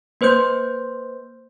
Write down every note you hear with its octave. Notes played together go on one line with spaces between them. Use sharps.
A#3 B4 C5 C6 G6